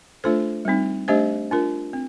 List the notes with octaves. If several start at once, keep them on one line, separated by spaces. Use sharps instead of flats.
A3 D4 F4 A4 C5
G3 C4 D#4
A3 D4 G4 C5 D#5
D4 F4 A#4
C4